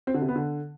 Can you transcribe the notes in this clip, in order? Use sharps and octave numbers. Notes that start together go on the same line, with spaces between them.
C4
D3
C3
B3
D3